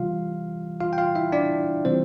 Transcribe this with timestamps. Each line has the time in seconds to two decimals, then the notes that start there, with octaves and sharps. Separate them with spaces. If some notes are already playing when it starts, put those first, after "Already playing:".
Already playing: C3 E3 G3 F4 F5
0.80 F4 F5
0.93 G5
0.98 F4 F5
1.15 E4 E5
1.32 D4 D5
1.85 C3 E3 G3 C4 C5